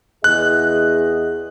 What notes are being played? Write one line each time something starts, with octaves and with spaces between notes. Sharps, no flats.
E2 G#4 D#5 F#6